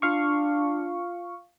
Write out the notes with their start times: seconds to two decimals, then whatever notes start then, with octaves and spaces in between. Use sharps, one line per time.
0.02 D4 F4 F5 C#6